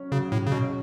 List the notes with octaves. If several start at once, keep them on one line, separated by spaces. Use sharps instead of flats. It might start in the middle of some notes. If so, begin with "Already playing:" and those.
Already playing: F#3 C#4
C#3 F#3
A2
C#3
B2 C#4